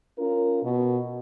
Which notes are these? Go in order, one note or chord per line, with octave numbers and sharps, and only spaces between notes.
C#4 F4 A#4
B2